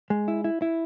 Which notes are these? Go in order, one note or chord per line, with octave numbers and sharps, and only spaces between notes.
G#3
E4
E4
E4